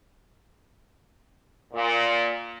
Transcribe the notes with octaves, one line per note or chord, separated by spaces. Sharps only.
A#2